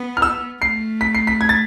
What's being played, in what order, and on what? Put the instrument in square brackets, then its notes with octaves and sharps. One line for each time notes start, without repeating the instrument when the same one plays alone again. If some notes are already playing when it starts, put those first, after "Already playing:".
Already playing: [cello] B3
[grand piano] F6
E6
[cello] A3 [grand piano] C7
[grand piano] B6
C7
B6
G#6
A6